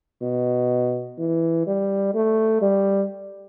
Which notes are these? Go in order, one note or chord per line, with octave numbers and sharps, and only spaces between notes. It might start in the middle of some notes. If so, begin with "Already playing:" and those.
B2
E3
G3
A3
G3